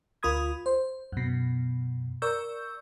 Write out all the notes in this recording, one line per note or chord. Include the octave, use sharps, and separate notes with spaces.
D2 F4 A#4 B5 D#6 G#6
C5
F#2 B2
A#4 D5 C#6 E6 G6